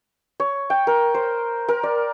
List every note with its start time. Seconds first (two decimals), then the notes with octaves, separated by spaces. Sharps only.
0.40 C#5
0.70 G5
0.87 A#4
1.14 C5
1.68 A#4
1.83 D5